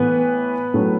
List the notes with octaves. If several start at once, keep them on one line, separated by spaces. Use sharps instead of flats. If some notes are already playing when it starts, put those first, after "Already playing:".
Already playing: A2 E3 A3 B3 B4
A2 F#3 A3